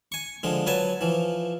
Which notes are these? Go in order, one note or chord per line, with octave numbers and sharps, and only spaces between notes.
G#5 C#6
D3 F3 G#3
F#3 B4 G#5 A5
E3 F3